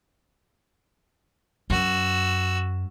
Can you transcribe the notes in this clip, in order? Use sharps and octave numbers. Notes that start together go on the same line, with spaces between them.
F#2 F#4 E6